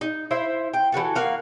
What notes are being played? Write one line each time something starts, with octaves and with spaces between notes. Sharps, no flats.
D#4
E4 C5 E5
G5
E3 G3 F#4 A4
A#3 F#4 F5